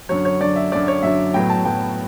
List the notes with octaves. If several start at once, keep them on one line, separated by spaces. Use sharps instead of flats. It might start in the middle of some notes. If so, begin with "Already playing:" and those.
F#2 D3 F#3 C#5
C#5
F#2 D3 F#3 D5
E5
F#2 D3 F#3 D5
C#5
F#2 D3 F#3 E5
A2 F#3 B3 G5
A5
A2 F#3 B3 G5